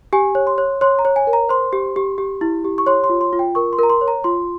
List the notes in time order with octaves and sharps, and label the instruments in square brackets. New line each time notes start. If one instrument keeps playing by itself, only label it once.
[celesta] G4 G#5
C#5
C6
C#5
C#5 C6
A#5
C#5
G#5
A#4
A#5
C5 C6
G4
G4
G4
E4
G4
C#6
C#5 C6
C6
F4
C6
F4
G5
A#4 C#6
C6
A#4 A#5
C6
C#5
A#5
F4 C6